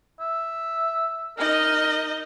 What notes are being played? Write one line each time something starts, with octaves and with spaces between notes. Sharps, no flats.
E5
D#4 A#4 D#5